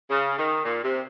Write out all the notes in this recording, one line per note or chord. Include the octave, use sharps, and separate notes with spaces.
C#3
D#3
A#2
C3